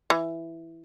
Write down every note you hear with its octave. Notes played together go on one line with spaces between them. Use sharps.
E3